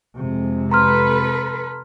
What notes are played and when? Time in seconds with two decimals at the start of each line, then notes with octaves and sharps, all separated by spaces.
0.16 F2 C3 G#3
0.72 A4 B4 A#5 C6 F6